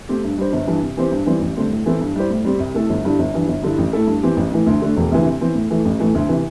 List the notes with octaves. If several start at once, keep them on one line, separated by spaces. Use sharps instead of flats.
A3 C4 G4
G2
G3 D4 C5
G1
G2 E3
C3
E3 C4 G4 C5
G2
E3 G3 C4
A1
G2 D3 A3 C4
A2
E3 C4 E4 A4
G2
G3 E4 G4 C5
A2
G3 C4 G4
C2
C3 A3 E4 A4
G1
G2 D3 G3 E4
G1
G2 E3 G3
G1
G2 D3 G3 E4
A1
A2 A3 E4 A4
G2
E3 C4 G4
A1
A2 E3
D2
D3 A3
E1
D2 C3 E3
C3
E3 C4
A2
E3 A3
A1
A2 E3 A3
D2
C3 E3